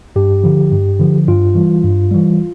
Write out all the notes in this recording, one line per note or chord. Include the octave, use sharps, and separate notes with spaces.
G2 G4
D3 F3
G2
D3 F3
G2 F4
E3 G3
G2
E3 G3